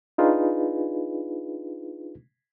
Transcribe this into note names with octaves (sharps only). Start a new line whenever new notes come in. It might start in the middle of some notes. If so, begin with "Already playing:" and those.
D4 D#4 F4 G#4 B4